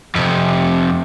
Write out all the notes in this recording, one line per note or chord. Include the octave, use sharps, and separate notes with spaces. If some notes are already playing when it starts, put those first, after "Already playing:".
F2 C3